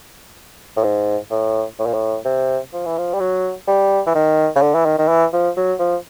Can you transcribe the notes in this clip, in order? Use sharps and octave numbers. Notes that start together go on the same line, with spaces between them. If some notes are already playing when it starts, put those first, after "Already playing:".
A2
G#2
A2
A2
A#2
A2
C3
F3
E3
F3
G3
F#3
G3
E3
D#3
C#3
D3
E3
D#3
D#3
E3
F3
F#3
F3